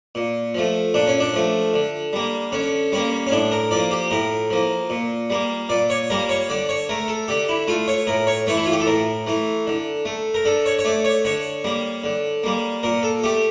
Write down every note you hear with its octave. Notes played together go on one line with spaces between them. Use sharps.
A#2
F3 A3
A#2 D4
C#4
D4
F3 A3
D3
G3 A#3
D3 C#4
G3 A#3 C#4
C#4
A2 D4
A#4
F3 A#3 D5
G4
A2 A#4
F3 A#3
A#2
G3 A#3
A#2 D5
C#5
G3 A#3 A#4
C#5
D3 D5
C#5
A3 A#4
A4
D3 G4
E4
A3 F4
C#5
A2 A#4
C#5
E3 A3 C#5
E4
F4
G4
A4
A2 A#4
E3 A3
D3
A3
A#4
D3 A4
C#5
C#5
A3 D5
C#5
D3 C#5
G3 A#3
D3
G3 A#3
A#2 A#4
A4
A3 G4